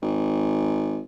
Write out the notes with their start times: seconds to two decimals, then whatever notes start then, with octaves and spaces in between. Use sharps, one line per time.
0.02 G#1